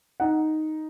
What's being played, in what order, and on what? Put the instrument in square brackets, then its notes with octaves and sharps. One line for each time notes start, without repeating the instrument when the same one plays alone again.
[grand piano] D#4 F#5